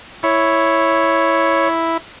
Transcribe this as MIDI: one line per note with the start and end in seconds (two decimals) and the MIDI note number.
0.23 1.97 64
0.23 1.68 73